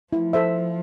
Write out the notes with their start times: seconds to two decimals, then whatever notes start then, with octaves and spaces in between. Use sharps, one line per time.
0.13 F3 E4
0.33 A4 C5 E5